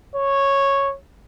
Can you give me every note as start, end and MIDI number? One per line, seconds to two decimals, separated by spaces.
0.16 0.90 73